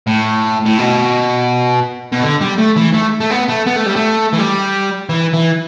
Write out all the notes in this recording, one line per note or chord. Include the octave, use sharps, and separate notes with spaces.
A2
A2
B2
B2
D3
G3
A3
E3
A3
A3
B3
A3
B3
A3
G3
A3
E3
G3
E3
E3